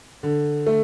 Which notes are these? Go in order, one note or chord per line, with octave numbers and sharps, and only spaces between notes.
D3
A3